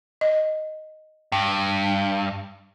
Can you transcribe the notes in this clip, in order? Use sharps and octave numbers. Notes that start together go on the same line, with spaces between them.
D#5
G2 G5